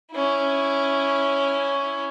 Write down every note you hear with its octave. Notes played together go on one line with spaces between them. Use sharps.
C#4 E4